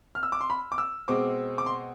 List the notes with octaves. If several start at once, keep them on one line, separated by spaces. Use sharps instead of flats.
F6
E6
D6
C6
B5
D6
E6
B2 G#3 C4 D6
D6
C6